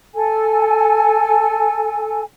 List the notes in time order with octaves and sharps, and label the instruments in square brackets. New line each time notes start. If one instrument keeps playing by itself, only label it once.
[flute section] A4 G#5